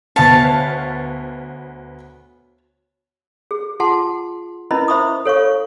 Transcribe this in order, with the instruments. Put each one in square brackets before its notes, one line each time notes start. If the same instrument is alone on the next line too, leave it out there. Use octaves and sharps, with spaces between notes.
[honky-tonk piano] D2 B3 F5 [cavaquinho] C#5 A5
[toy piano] G#4
F4 G#4 F#5 A5 C6
C#4 E4 A#4 B4 D#5 B5
E4 C5 E5 B5 C#6 D#6
A4 C#5 F5 C#6